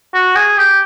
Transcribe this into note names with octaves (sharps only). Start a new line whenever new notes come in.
F#4
G#4
G4